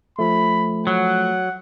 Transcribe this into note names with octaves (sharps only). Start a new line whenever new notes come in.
F3 A3 B5
F#3 F#5